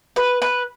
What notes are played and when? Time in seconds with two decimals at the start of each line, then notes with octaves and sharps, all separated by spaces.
0.16 B4
0.42 B4